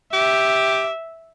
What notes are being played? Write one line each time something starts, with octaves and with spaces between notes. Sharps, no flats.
G4 E5